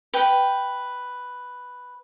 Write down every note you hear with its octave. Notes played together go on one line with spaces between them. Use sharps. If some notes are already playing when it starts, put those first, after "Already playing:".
B4 G5